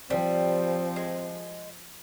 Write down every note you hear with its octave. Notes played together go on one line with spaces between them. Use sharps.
F3 G3 C4
G#3